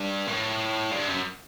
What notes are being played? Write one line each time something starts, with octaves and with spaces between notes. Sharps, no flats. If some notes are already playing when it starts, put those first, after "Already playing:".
Already playing: G2
A2
G2
F#2